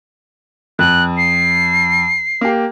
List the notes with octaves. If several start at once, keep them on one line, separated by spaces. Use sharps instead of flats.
F2 F#6
C7
A#3 G4